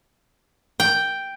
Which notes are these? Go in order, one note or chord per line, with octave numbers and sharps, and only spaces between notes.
G5